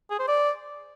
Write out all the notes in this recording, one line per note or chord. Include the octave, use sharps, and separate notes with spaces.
G#4
C5
D5